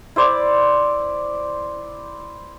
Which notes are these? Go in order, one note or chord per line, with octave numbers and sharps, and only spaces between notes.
E4 C5 D5